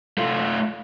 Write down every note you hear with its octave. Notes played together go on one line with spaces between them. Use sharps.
A3 F4